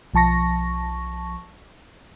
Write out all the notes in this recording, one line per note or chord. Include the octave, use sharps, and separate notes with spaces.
B1 F3 A5 C#6 A#6